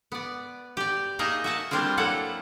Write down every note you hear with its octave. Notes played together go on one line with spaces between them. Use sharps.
B3 D5
G4 D5
A#3 D#4 G#4 A#4 D#5 E5
F#4 E5 A5
G3 A#3 C4 D4 E4 F4
F#3 A#3 E4 A4 F#5